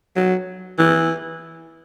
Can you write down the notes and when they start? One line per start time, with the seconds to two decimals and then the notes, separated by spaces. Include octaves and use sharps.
0.16 F#3
0.78 E3